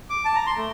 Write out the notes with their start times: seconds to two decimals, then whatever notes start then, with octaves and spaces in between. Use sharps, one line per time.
0.10 D6
0.25 A5
0.35 A#5
0.47 C6
0.57 A3